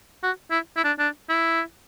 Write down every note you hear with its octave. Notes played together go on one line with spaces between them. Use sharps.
F#4
E4
E4
D4
D4
E4